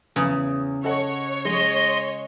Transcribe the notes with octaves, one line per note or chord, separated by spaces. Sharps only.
E2 C#3 D#6
A4 C#5 D#5 F#5
G#3 D#5 C6